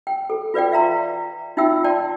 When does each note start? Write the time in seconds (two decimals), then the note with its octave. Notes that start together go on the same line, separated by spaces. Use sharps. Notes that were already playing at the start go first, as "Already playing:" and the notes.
0.07 G5
0.30 A4
0.54 F4 B4 D5 F5 G5
0.72 E5 F5 A#5 C6
1.57 D#4 F4 E5 G5 E6
1.84 D5 G5 A5 C6